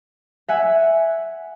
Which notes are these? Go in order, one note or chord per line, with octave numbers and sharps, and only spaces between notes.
E5 F#5 G#5